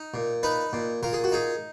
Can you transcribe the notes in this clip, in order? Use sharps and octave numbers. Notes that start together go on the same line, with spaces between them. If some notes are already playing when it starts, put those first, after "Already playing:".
Already playing: D#4
A#2
D#4 B4
A#2
A#2 A#4
G#4
F#4
D#4 G#4